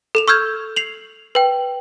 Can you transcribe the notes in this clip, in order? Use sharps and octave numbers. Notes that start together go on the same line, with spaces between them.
A4 E7 F7
C#6 E6 F6 G6 G#6
C7 F7 F#7
B4 G5